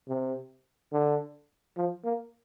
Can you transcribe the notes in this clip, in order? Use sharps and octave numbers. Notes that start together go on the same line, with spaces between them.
C3
D3
F3
A#3